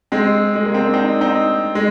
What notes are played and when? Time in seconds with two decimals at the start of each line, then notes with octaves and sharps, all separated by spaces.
0.12 G#3 C4
0.55 G#3
0.65 A#3
0.74 C4
0.85 D4
0.93 C4 D#4
1.21 C4 D#4
1.75 G#3